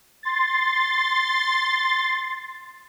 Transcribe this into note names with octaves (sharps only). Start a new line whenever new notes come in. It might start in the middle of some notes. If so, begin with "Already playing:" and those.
C6 A6